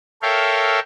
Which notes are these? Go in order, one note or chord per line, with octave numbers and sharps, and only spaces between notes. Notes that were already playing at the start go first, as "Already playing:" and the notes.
A4 A#4 C#5 E5 F5 G5